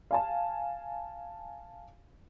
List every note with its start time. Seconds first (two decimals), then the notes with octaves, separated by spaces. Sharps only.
0.11 F5 G#5 A5